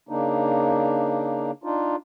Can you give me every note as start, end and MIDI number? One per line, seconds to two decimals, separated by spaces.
0.09 1.51 49
0.09 1.51 58
0.09 1.51 62
0.09 1.51 63
1.64 1.96 62
1.64 1.96 63
1.64 1.96 65